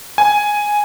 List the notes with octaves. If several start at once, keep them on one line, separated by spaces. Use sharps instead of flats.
G#5